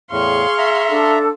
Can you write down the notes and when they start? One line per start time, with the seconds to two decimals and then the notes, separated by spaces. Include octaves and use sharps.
0.12 E2 A2 G#4 F5 C6 C#6
0.58 E5 A#5
0.88 D4 A4